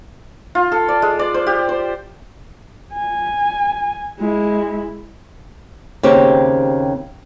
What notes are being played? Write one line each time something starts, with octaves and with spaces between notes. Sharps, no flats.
F4
A4
D5
G#3
D5
C5
G4
C5
G#5
G#3 E4
D#2 C#3 C4 G4 C5 C#5